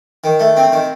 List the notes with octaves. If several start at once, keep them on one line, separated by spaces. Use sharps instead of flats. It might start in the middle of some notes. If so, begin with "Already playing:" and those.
D#3
A3
C4
D#3